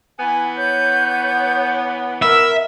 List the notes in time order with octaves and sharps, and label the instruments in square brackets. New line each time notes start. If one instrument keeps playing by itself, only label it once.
[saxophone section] E3 B3 [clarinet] G#5
[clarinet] C#5 [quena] G6
[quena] A#4 [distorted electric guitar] E5 [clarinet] B5